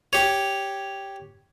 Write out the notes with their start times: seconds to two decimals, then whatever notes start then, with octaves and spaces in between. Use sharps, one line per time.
0.13 G4 C#5